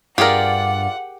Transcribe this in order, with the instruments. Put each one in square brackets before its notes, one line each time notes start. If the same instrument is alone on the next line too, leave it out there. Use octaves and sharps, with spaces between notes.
[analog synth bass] G2 [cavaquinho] F4 D5 [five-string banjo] G4 G#4 A#4 [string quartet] F#5